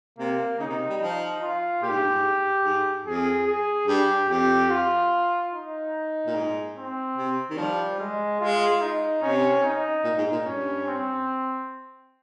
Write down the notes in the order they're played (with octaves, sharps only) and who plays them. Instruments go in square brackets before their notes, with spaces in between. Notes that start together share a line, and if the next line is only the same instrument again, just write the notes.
[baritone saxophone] C3 [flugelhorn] A#3
[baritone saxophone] C#3 [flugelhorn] D#4
[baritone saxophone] C3
G3
[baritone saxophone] F3 [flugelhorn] D#4
[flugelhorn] F4
[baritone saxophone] A#2 [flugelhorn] G4
[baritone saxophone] G#2
G2
G#2
G#2
[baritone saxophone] F2 [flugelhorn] G#4
[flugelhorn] G#4
[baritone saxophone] G2 [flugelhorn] G4
[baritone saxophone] F2 [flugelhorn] G4
[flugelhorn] F4
D#4
[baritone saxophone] A#2
G#2
[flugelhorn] C4
[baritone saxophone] C3
D#3
[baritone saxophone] F3 [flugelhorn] G3
[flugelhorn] G#3
[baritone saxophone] G#3 [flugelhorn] F4
[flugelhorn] D#4
[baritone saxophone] C3 [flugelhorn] C#4
[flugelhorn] D#4
[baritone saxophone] A#2
G#2
A#2
[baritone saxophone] G2 [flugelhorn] C#4
[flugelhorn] C4